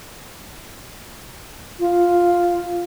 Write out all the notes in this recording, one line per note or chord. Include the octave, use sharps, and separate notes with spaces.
F4